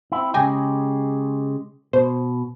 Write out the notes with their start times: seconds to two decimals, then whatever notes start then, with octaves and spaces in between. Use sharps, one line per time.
0.12 C4 E4
0.34 C#3 G#3 G4 G5 G#5 A#6
1.93 B2 C5